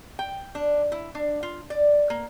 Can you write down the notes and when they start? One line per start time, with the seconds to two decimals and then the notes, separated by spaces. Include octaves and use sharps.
0.19 G5
0.55 D4
0.92 E4
1.15 D4
1.43 F4
1.70 D5
2.10 A#3